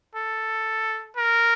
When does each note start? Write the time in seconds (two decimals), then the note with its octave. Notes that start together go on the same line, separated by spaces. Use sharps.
0.15 A4
1.17 A#4